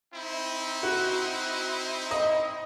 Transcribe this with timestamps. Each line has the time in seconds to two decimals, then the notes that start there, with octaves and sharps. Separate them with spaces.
0.14 C4 D#4 E4
0.83 F#4
2.11 D#5